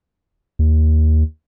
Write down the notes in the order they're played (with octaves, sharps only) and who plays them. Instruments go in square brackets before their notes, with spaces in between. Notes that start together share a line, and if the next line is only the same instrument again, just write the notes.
[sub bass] D#2